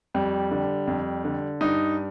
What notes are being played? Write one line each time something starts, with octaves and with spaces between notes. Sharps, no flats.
F2 G3
D3
F2
D3
G2 D#4